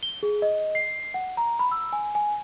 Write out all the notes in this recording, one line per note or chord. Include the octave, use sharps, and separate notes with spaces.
G7
G#4
D#5
C7
F#5
A#5
B5
E6
G#5
G#5